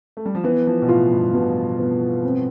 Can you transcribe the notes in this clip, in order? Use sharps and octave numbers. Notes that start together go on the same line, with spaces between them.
A3
G3
F3
E3 B3
F3
B2
A2 F4
G2
G2 B2
B3
C4